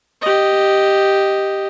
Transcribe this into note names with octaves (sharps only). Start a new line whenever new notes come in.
G4 D#5